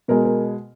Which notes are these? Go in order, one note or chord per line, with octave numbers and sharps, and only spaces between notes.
B2 G#3 A#4
A#4